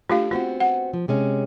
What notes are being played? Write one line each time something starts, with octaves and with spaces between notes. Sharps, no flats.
A3 D4 F4 G4 F5
B3 C4 F4 F#4
F#5
F3
C3 G#3 C#4